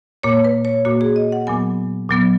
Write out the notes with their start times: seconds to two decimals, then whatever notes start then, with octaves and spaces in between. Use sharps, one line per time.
0.23 A#2 A#3 C#5
0.45 B4
0.65 C#5
0.85 A#2 A#3 F#4
1.01 G#4
1.16 D#5
1.32 F#5
1.47 A#2 F#3 B3 G#5
2.09 A#2 F#3 B3